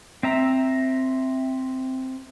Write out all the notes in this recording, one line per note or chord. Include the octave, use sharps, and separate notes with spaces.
C4 E5 A#5